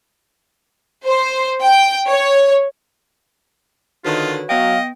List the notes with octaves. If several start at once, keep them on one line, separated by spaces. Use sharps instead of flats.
C5
G5
C#5
D3 D#3 F4 F#4 B4 C#5
F#3 B3 D#5 F5 G5